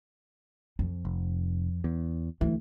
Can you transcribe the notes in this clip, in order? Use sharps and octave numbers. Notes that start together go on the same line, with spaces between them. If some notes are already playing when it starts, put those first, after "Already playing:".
F2
F1
E2
D2 E3